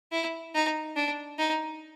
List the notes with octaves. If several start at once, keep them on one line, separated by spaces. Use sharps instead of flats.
E4
D#4
D4
D#4